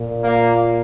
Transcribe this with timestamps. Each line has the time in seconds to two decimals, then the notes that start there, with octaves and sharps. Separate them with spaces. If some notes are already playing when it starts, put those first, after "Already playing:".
Already playing: A#2
0.25 A#3